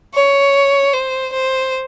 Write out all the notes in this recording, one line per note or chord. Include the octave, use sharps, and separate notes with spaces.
C#5
C5
C5